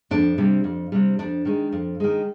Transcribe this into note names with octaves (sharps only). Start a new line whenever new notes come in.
F2 D4
C3 G3
F2
C3 G3
F2 D4
D#3 G#3
F2
D#3 G#3